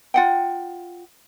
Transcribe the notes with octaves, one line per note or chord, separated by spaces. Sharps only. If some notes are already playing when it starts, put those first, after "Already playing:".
F4 F#5 G5